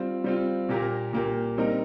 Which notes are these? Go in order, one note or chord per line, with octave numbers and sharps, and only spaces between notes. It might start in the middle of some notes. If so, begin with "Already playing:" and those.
Already playing: G3 C4 F4
G3 C4 F4
A#2 A#3 G4 A#4
A#2 A#3 G4 A#4
G3 C4 D#4 A#4